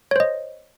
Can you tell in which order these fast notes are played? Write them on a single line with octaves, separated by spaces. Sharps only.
C#5 C5 D#5